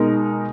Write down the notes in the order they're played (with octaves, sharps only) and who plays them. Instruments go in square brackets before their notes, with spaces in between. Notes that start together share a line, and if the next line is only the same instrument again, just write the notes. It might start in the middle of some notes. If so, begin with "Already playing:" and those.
Already playing: [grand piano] B2 G#3 D#4 A#4